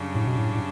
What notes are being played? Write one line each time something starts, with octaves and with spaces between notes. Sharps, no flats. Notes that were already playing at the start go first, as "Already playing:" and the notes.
Already playing: F#2 C#3 G3 D4
A2
B2
A2
A2